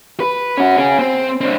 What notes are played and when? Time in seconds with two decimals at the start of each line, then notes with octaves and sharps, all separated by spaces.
0.20 B4
0.57 C#4 F#4
0.77 C#4 G#4
0.99 C4
1.41 C4 D4